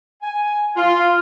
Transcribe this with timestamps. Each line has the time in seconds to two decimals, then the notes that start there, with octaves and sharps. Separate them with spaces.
0.22 G#5
0.77 F4